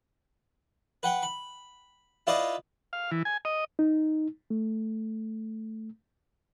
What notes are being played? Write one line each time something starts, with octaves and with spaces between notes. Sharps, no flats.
B4 F#5 G5
B5
E4 F4 B4 D5 D#5 F5
F5
E3
G#5
D#5
D#4
A3